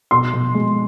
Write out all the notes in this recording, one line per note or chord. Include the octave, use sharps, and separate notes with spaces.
B2 C6
B2
G#3